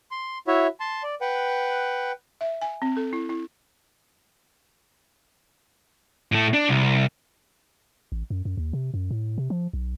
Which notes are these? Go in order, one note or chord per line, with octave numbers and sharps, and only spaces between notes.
C6
E4 F#4 C#5 E5
A5 C6
D5
B4 F#5 G5
E5
G#5
C4
A4
E4
E4
A2 A3
D4
C2
A1
F#2
F#2
D#2
C3
F#2
A2
C3
F3
B1